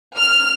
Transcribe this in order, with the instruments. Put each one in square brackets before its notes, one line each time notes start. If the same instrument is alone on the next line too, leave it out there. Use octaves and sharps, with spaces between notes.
[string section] F6